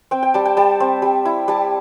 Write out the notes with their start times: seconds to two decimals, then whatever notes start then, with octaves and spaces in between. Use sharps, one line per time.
0.11 C4 G5
0.23 G5
0.34 G3 A5
0.45 G5
0.57 G3 A5
0.80 C4
1.02 G3
1.25 E4
1.48 G3 A5